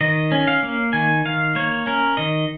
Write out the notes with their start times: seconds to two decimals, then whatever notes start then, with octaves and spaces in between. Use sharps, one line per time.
0.01 D#3 D#5
0.32 C#4
0.47 F5
0.63 A#3
0.93 D#3 G#5
1.25 D#3 F5
1.55 A#3 C#5
1.86 C#4 A#4
2.17 D#3 D#5